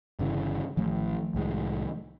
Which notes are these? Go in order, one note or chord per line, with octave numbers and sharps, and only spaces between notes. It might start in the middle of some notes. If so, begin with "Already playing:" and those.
G1 C#3 E3
A1 D#3 F3 A3
C2 A2 G#3